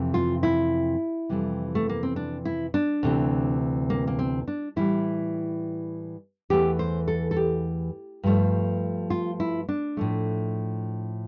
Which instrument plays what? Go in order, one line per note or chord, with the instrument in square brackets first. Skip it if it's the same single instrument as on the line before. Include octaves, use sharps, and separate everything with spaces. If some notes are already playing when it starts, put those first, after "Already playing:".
Already playing: [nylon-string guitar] F2 C3 E3
F4
E4
F2 C3 E3 G3
A3
A#3
C4
D4
E4
D4
D2 C3 E3
A#3
A#3
C4
D4
A2 E3 G3 E4
E2 E3 A3 G4
C5
A4
A4
G4
G2 F3 A3
F4
E4
D4
A2 F3 A3